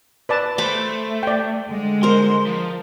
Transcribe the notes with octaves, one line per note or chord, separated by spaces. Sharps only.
B4 D5 A5
A3 C5 B5 D6
D5 G5
D3 G#3
A#4 C5 C6
F3